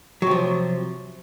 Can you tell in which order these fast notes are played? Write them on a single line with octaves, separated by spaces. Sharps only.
F#3 C3 F3